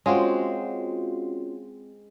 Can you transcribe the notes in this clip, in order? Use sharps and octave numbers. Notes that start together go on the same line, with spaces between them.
G#3 C4 C#4 F4 F#4